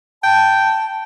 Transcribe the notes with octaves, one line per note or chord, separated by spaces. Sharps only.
G5 A5